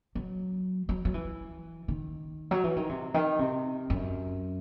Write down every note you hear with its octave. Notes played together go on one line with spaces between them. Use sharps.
F#3
F#3
F#3
E3
D#3
F#3
E3
D#3
C3
D#3
C3
F#2